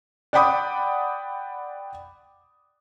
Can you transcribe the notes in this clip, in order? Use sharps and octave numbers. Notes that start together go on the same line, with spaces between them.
D5 F#5 G5 B5 D6 D#6